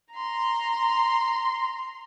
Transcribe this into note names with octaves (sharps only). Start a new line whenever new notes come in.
A#5 C6